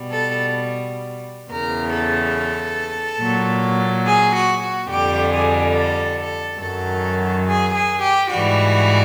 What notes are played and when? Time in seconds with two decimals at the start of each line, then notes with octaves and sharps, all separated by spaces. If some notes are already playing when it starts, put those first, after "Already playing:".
Already playing: B2 G3
0.10 A4
1.51 E2 C#3 E3 A#4
1.93 A4
3.21 A#2 F#3
4.05 G#4
4.35 F#4
4.62 F#4
4.90 F2 D3 G3 G4
5.33 G#4
5.75 A4
6.18 A4
6.60 F#2 D#3 F#3 A4
7.45 G#4
7.73 G#4
8.01 G4
8.30 G#2 E3 G3 F#4